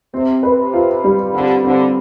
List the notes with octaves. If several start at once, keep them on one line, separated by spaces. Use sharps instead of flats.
C3 C4
C3 B4
F4
G3
D3 C4
D3 C4